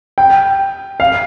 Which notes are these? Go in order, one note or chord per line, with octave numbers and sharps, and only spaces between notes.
G5
F5